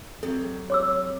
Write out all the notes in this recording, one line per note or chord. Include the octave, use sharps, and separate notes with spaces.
C3 F#3 A4
C#5 D6 E6